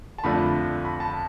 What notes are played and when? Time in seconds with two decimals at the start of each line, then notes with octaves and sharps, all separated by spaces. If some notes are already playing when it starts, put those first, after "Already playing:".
0.18 A5
0.24 F2 D3 F3 A3 D4 B5
0.85 B5
1.00 A5